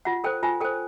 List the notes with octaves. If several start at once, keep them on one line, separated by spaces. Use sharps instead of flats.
F4 F#5
A4 C5 G5
F4 G#5
A4 C5 G5